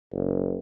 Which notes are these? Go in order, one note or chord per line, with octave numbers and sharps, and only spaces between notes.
F#1